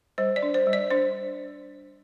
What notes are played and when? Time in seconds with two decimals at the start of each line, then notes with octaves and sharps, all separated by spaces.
0.18 G3 C5
0.36 D5
0.42 D4
0.54 C5
0.67 G3
0.73 D5
0.90 D4 C5